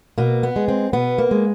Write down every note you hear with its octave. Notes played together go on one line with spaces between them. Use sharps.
B2 A#3
B3
G#3
C4
B2 B3
A#3
G#3